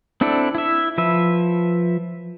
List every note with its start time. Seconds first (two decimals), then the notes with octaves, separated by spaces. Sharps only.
0.21 C4 D4 E4 A4 D5
0.55 E4 E5
0.98 F3 B4 E5